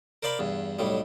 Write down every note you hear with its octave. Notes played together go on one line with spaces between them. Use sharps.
A#4 C5 D5 F5 B5
E2 G2
B1 A2 G3